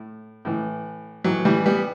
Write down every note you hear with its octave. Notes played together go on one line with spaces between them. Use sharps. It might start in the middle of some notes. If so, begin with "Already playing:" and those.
Already playing: A2
A2 E3
A2 E3 F#3
E3 G3
G3 B3